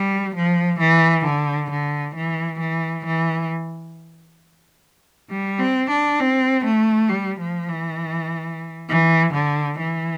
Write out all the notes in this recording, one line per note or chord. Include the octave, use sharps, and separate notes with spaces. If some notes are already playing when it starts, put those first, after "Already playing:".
Already playing: G3
F3
E3
D3
D3
E3
E3
E3
G3
C4
D4
C4
A3
G3
F3
E3
E3
D3
E3